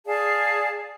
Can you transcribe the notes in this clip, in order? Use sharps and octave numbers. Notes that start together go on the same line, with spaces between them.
G#4 D5 F5 A5